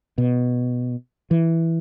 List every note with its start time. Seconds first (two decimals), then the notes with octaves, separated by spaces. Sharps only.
0.18 B2
1.31 E3